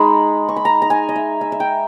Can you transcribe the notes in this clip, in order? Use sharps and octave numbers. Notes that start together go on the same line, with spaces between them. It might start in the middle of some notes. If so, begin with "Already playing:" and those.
Already playing: G#3 D#4 B5
C#6
B5
A#5
A#5
G#5
D#5
E5
E5
E5
G5